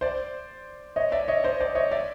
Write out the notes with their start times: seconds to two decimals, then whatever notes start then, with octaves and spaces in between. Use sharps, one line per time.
0.01 C5 D5
0.96 C#5 D#5
1.12 D5 E5
1.28 C#5 D#5
1.44 C5 D5
1.60 C5 D5
1.75 C#5 D#5
1.91 D5 E5